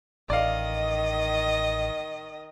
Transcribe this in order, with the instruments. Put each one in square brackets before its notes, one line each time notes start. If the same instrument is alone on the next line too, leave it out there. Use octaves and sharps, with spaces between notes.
[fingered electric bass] A1 [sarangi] D#3 [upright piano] D5 F5 [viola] D#5